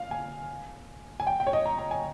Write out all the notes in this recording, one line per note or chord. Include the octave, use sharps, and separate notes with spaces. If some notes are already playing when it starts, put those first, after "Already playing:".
Already playing: F5
G#5
G#5
G5
G5
C#5
D#5
A#5
A#5
G#5